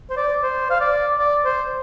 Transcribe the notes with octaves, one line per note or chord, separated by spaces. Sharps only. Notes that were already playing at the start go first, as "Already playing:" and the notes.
C5
D5
C5
F5
D5
D5
C5